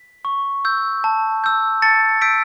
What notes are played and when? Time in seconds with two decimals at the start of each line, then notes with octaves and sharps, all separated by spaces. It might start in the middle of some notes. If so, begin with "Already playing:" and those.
Already playing: B6
0.25 C#6
0.65 E6 G6
1.04 A5
1.44 E6 G6
1.82 A5 A6 C#7
2.21 E6 G6 B6 D7